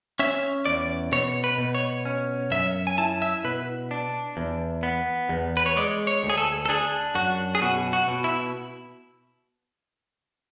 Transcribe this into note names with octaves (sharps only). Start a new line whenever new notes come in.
C#4 E5
E2 D5
B2 C#5
B4
B2
C#5
C#4
F#2 E5
G#5
E4 A5
E5
B2 B4
D4
E2
B3
E2
B4
C#5
G#3 D5
C#5
D2
G#4
A4
A4
D4 G#4
F#2 F#4
G#4
B2 F#4
F#4
B2
E4